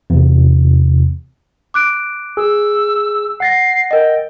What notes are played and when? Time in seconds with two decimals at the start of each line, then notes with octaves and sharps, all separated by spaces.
0.10 E2 C3
1.74 D6 F#6 D7
2.37 G#4 E6
3.40 F#5 A6 A#6 C7
3.91 A#4 D#5 G5